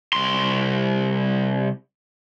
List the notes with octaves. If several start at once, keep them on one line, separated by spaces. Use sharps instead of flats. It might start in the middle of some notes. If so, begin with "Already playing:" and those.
C2 C6